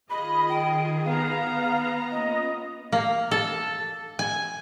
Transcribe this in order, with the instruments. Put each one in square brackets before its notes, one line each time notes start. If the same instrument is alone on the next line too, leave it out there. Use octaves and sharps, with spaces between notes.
[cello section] D#3 G#4 [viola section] F4 D#5 [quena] B5
[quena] G5
[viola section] B3 A#5 [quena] F5
[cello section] A#3 C#4 F4 [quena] D#5
[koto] A#3
A4
G#5